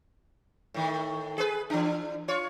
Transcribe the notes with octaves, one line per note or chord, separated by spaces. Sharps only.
A2 D#3
G#4 B4
E3 D4
F4 C#5